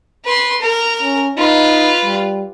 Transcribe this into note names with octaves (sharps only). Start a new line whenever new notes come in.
B4 C6
A#4
C#4
D#4 F4 B4
G3